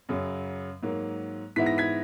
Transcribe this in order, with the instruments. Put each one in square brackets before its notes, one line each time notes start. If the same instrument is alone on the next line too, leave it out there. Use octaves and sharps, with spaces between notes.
[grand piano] F#2 C#3 F#3
G#2 F#3 A#3
G#2 E3 B3 E4 B6
A#6
G#6 B6